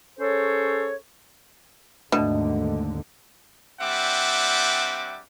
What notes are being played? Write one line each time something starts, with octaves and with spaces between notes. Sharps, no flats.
C#4 G#4 A4 C5 C#5
D#2 G#2 B2 D3 A3 D4
G3 C4 D4 E5 F#5 D6